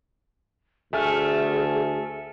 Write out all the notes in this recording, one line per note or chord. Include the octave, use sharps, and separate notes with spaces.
D2 A3 G#4 E5 G#5 F6